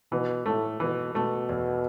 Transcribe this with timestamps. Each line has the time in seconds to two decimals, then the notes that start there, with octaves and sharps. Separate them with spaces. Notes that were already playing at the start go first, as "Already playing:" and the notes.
0.12 B2 E3
0.46 A2 A3
0.80 B2 E3
1.14 B2 A3
1.49 E2